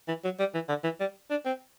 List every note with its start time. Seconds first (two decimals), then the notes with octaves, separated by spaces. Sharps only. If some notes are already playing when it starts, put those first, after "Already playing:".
0.08 E3
0.24 F#3
0.39 G3
0.54 E3
0.69 D3
0.84 E3
1.00 G3
1.31 D4
1.45 C4